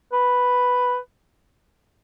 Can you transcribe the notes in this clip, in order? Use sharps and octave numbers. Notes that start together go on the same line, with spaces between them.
B4